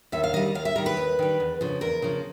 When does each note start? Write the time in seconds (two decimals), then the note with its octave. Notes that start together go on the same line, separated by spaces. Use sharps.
0.12 D#2 E5
0.24 F5
0.33 D#3 D#5
0.36 G3
0.55 D#2 F5
0.65 E5
0.75 G3 A#4
0.78 D#3
0.86 B4
0.97 D#2
1.19 D#3 G3
1.40 E2
1.61 C#3 F3
1.81 E2 A#4
2.02 C#3 F3